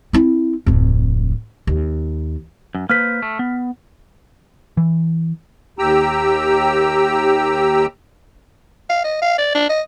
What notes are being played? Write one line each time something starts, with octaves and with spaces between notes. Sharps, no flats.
C4 E4
D1 F2
D#2
F#2
A#3 B4 C5 F6 B6
A3
B3
E3
D#2 G4 G5 A#5 E6
F5
D#5
F5
D5
D4
D#5